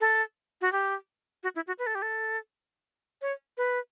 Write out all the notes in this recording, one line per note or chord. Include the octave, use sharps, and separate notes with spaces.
A4
F#4
G4
F#4
E4
F#4
B4
A4
G4
A4
C#5
B4